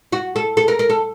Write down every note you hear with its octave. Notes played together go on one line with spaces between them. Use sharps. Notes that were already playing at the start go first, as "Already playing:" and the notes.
F#4
A4
A4
A#4
A#4
A4